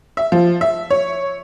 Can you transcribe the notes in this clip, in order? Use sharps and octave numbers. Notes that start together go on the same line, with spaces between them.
E5
F3
E5
C#5